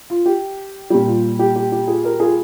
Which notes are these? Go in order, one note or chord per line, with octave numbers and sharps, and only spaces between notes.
F4
G4
A#2 G3 G4
F4
G4
G4
G4
F4 G#4
G4 A#4
F4 G#4